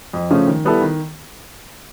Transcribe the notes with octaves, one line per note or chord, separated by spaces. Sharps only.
F2
C#3 F3 A3 C#4
D#3
G3 B3 E4 A4
D#3